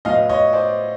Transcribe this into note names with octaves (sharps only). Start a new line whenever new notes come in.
A2 F#3 B3 D#5 F5
C#5 D#5
C5 D5